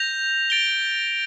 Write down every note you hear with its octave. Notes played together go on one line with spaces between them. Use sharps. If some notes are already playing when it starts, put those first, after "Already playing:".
Already playing: G6 A#6 F7
A6 D7 G7